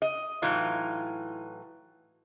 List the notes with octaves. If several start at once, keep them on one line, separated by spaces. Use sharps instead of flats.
D#5
A2 E3 F#3 D#4 F4